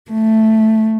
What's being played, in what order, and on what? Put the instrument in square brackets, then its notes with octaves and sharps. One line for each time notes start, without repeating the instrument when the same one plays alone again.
[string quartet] A3